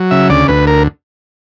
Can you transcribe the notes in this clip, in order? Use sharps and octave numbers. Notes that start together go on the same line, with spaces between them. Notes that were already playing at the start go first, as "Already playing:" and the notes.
Already playing: F#3
C#3 E5
D2 D5
D2 B4
A#4